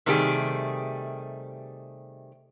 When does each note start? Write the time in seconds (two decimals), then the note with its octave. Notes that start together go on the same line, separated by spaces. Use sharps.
0.06 C3 D#3 G3 A3 G4 G#4